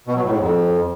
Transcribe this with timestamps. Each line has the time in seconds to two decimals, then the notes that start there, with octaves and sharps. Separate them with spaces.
0.07 B2
0.15 F#3
0.23 A2
0.32 G#2
0.40 F2